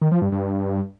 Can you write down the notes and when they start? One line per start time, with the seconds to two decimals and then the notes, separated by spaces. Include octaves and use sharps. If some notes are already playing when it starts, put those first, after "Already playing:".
0.01 D#3
0.12 F3
0.22 G2
0.32 G2